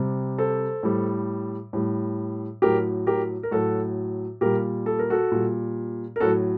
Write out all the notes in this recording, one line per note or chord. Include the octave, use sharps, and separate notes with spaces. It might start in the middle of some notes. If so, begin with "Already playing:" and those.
Already playing: C3 G3
A4 C5
A2 G3
A2 G3
A2 F#3 G4 A#4
G4 A#4
A#4
A2 F#3 F#4 A4
A#2 G3 G4 A#4
A4
A#4
F#4 A4
A#2 G3
A#4
A2 F#3 F#4 A4